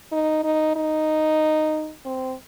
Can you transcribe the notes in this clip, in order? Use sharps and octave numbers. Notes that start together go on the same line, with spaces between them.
D#4
D#4
D#4
C4